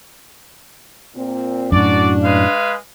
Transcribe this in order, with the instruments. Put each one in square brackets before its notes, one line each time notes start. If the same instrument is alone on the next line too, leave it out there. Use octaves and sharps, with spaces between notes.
[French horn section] A#2 C4
[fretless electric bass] F#2 A2 [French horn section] D4 [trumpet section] F#4 D5
[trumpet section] G#3 B4 F5